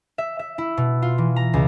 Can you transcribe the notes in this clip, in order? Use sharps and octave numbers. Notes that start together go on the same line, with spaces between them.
E5
E5
E4
B2
F4
E3
A#5
C#2